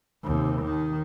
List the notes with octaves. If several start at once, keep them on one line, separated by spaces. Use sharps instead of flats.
D#2 C3
D#3